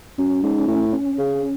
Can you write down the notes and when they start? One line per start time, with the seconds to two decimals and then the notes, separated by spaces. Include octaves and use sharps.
0.18 F#2 C#4
0.43 G#2
0.68 A2
0.93 C#4
1.18 C#3